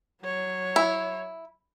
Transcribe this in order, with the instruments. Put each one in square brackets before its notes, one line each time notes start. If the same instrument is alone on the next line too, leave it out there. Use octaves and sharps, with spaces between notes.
[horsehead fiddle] F#3 C#5
[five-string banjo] E4